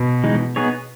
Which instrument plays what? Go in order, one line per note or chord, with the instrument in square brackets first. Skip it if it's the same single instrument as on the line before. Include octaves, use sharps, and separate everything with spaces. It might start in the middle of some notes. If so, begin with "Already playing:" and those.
Already playing: [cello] B2
[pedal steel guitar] E3 G#3 D#4
B3 D#4 G#4 C#5